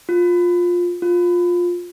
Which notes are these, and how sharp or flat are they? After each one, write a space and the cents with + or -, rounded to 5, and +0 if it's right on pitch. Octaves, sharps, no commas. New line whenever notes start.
F4 +15
F4 +15